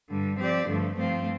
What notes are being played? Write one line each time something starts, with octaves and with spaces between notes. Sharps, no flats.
G2 D3 G3
F3 C4 G4 D5
G2 D3 F3 A3
G2 F3 A3 C4 F4